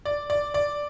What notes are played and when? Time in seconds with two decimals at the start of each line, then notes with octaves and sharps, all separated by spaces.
0.05 D5
0.30 D5
0.54 D5